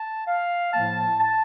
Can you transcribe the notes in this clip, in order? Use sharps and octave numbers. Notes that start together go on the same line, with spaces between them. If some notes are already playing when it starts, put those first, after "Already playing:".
Already playing: A5
F5
A2 F3 A#3 A5
A5